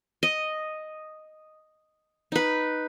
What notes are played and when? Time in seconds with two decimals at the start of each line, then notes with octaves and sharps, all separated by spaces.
0.23 D#5
2.32 D#4 B4